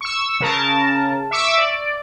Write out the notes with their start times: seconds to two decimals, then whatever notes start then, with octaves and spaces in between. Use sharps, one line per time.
0.01 C#6 E6
0.40 C#3 A#4 A5
1.31 E5 C#6 D6 E6
1.58 D5